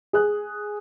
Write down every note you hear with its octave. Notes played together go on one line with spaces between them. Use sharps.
G#4 F#6